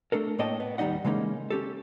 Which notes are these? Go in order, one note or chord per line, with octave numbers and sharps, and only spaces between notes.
A3 D4 A4 A#4
A2 A#3 C#5 D#5 G5 A5
B3
D#2 G3 G#3 D#4 D#5 F#5
C#3 E3 G#3 A#3 C#4 D#4
C#4 G4 A4